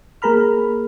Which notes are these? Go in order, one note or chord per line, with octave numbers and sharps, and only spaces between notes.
A#3 G#4 A#4 A#5 B5 F6